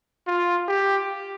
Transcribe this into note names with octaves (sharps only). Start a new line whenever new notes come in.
F4
G4